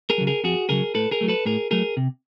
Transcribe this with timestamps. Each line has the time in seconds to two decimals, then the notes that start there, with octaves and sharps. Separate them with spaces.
0.10 G#4 A#4
0.18 C#3 F#3
0.27 G#4 A#4
0.44 F2 F#4 G#4
0.69 C#3 F#3 G#4 A#4
0.95 A2 A4 B4
1.11 G#4 A#4
1.21 F#3 A3
1.28 A4 B4
1.46 A2 G#4 A#4
1.71 F#3 A3 G#4 A#4
1.97 C3